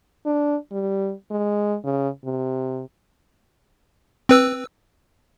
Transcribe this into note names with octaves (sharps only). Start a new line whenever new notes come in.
D4
G3
G#3
C#3
C3
C4 B4 E6